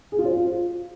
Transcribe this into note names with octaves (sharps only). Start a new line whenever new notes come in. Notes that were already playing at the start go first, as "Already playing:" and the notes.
G#4
F4
C5
F4